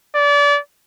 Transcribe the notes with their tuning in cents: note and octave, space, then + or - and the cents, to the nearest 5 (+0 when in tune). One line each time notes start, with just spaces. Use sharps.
D5 -30